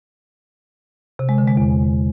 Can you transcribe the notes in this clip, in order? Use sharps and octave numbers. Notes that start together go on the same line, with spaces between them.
C3
G#3
D3
G#3
E2